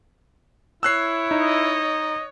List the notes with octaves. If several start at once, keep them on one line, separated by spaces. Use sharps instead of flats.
E4 C#5 E6 F#6 C7
D#4 D#5